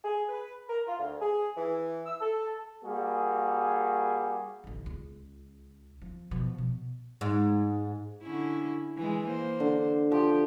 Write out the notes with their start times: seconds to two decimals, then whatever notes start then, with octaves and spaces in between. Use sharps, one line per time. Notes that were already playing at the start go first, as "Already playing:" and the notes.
0.04 G#4
0.29 B4
0.69 A#4
0.87 F4
0.99 D2
1.21 G#4
1.57 E3
2.06 E6
2.20 A4
2.84 G3 A#3 F#4 G#4
4.64 A1 D2
4.86 C#2
6.02 F3
6.31 B2 F3
6.58 B2
7.21 G#2
8.22 D3 C#4 E4
8.97 E3 G#3
9.26 A#3 C5
9.60 D3
10.12 F3 G4